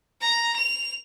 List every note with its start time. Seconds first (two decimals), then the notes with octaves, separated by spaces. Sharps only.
0.21 A#5
0.57 F7